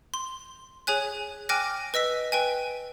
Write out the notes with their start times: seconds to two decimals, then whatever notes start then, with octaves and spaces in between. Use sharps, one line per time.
0.14 C6
0.87 G#4 C#5 G#5 F#6
1.49 G5 G#5 D6 F6 F#6 A#6
1.94 B4 D#5 E6 B6
2.32 B4 G5 G#5